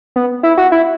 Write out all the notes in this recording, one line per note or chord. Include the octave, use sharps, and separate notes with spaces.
B3
E4
F#4
E4